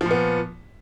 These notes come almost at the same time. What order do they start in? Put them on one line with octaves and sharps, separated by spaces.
F3 A#2 B3